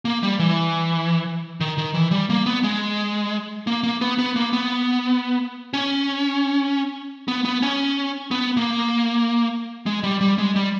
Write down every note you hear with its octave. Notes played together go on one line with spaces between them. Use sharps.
A#3
G3
E3
D#3
D#3
E3
G3
A#3
B3
G#3
A#3
A#3
B3
B3
A#3
B3
C#4
B3
B3
C#4
B3
A#3
G#3
G3
G3
G#3
G3